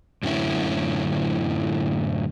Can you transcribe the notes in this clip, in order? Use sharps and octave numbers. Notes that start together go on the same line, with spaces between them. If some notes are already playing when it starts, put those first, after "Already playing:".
F#2 A2 D3 C#4 E4